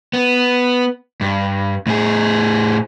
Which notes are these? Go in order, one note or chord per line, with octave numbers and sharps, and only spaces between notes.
B3
G2
A2 G#4